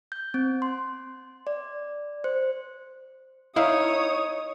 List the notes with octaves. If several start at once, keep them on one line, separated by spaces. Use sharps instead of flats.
G6
C4
C6
D5
C5
D#4 E4 C#5 E5 F5 D#6